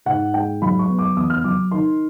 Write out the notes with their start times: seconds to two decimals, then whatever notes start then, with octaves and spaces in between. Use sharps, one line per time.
0.06 G#2 F#5
0.33 G#3 G5
0.62 F#3 B5
0.79 C#6
0.89 B3
0.99 D6
1.17 E2 D#6
1.30 F6
1.44 F#3 D6
1.71 D#3 C6